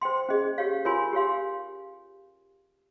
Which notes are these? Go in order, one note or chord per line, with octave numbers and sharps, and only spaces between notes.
C5 G5 C6
C#4 G#4 D#5
G4 C#5 F5
F4 A#4 C#5 G#5 C6
G4 C#5 F5 C6